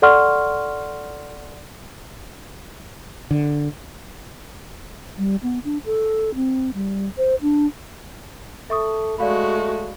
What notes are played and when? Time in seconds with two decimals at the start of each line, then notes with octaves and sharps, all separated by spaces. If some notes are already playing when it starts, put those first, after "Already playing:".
0.02 A4 D5 F#5 C6 C#6 F6
3.31 D3
5.18 G3
5.43 B3
5.64 D4
5.85 A4
6.35 C4
6.74 G3
7.17 C5
7.42 D4
8.70 A4 E5 C#6 D#6
9.18 G#3 A3 F#4 D5 F5 B5